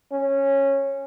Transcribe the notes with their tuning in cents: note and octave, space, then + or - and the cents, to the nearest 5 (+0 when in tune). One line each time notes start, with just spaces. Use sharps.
C#4 -15